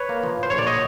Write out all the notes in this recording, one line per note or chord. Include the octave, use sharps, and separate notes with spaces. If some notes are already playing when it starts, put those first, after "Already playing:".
Already playing: B4 C#5
A#3
F3
A2
C5
A#1 C#5
D5
F#3 C#5 D#5